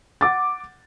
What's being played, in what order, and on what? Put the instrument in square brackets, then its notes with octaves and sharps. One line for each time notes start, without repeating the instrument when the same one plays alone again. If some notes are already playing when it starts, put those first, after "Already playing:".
[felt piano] F#5 D6 A6